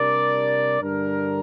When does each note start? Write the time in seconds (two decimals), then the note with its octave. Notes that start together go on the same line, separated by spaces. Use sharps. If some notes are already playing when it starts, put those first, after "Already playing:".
Already playing: C3 G3 D4 A#4 D5
0.81 G2 D3 G3 D4 A#4